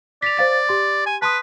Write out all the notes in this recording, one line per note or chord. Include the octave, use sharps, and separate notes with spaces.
D5 B6 F7
C5 F5 A6
G4 C6
G#5
B4 A5 C6 D#6